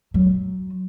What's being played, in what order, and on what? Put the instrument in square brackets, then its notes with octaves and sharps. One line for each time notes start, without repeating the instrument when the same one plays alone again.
[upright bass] F#3